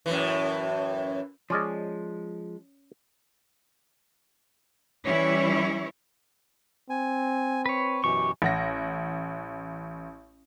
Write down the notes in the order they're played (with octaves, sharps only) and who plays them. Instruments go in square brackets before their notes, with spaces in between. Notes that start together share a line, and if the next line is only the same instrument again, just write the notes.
[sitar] F#2 A2 E3
[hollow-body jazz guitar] F3 G#3 [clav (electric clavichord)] C#4 D5 D#5
[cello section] E3 G3 C#4 E4 C#5
[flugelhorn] C4 [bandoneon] G#5
[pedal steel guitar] B4 C#5
[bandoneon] F#2 B2 E3 [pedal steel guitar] G4 C#6
[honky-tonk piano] A1 F#5 A#6